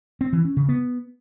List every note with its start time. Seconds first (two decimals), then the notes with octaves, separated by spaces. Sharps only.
0.21 C4
0.33 E3
0.45 C#4
0.57 C#3
0.69 B3